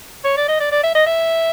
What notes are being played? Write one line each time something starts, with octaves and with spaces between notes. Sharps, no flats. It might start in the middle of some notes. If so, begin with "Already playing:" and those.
C#5
D5
D#5
D5
D5
E5
D#5
E5